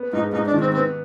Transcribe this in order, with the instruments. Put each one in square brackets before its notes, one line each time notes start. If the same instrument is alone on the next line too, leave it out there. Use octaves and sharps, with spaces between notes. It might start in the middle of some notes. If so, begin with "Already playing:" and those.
Already playing: [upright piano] B3
[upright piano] G#2 [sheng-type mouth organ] D#4
[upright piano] G#2 [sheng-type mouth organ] D#4
[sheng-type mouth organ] D4
[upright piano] D#3
[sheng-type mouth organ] C4
[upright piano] B3 [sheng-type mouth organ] C4